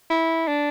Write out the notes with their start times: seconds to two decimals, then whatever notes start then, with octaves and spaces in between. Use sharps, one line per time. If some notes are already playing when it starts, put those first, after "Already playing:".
0.10 E4
0.48 D4